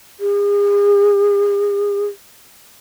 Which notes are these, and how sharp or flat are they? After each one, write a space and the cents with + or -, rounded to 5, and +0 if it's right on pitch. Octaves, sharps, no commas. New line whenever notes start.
G#4 -40